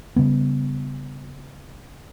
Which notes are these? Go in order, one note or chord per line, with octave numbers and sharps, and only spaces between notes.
C#3 G3 B3